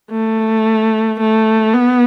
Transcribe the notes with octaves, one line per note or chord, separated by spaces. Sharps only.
A3
A3
B3